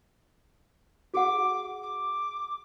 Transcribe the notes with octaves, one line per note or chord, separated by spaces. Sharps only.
F#4 G#4 F#5 D6
D6